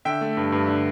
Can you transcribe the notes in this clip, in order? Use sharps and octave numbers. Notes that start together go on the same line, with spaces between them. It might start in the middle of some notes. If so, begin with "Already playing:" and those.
D3 E5 G5
A3
G2
G2
D3